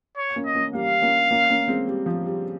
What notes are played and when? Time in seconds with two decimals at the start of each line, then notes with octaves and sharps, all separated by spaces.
0.17 C#5
0.36 A#3 C#4
0.45 D#5
0.55 A#3 C#4
0.73 G3 A#3 F5
1.02 A#3 C#4
1.31 A#3 C#4
1.50 A#3 C#4
1.68 G#3 C4
1.88 G3
2.06 F3
2.26 G3